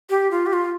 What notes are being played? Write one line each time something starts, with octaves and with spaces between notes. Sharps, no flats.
G4
F4
G4
F4